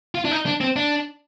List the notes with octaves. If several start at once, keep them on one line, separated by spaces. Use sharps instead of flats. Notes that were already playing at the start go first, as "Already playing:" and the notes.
F4
D4
D#4
D4
C4
D4